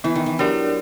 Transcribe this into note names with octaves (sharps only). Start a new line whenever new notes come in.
E3 B3
D#3
E3
F#3 D4 G4 A#4 D5